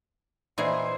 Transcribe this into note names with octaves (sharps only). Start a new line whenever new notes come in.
A#2 E3 G#4 C5 D#5